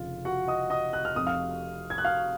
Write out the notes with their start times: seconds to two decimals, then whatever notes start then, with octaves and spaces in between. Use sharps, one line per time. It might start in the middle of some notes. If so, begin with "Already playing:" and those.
Already playing: F1 F2 C#3 F4
0.25 F#4 F#5
0.48 D#5 D#6
0.70 D#5 D#6
0.93 F#6
1.05 F6
1.16 F1 F2 C3 D#6
1.27 F5 F6
1.90 G#6
1.98 F#6
2.05 F5 F6